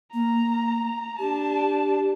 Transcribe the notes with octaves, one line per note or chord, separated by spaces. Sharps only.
A#3 A#5
D4 G4 A5